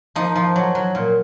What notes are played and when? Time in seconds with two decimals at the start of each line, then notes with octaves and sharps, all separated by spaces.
0.15 F3 D#4
0.35 F3
0.56 F#3
0.75 F#3
0.95 A#2